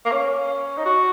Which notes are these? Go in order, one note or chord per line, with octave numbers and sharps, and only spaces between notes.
A#3
C#4
D#4
F#4